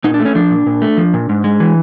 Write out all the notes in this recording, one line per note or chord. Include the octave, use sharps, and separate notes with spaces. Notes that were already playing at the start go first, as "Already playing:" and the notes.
A#2 D#4
D4
A3
C#4
F3 D4
A#2
A#2
A3
F3
A#2
G#2
G#3
E3